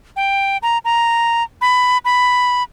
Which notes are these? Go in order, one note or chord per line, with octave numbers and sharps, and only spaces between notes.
G5
A#5
A#5
B5
B5